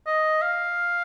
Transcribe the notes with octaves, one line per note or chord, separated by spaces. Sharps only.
D#5
F5